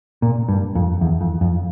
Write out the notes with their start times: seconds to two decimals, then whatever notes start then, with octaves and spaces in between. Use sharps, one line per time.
0.22 A#2
0.49 G2
0.75 F2
1.01 E2
1.21 F2
1.41 F2